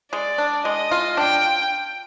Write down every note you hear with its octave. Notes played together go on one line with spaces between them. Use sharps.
G#3 D5
D4
G#3 D#5
F4
D4 G5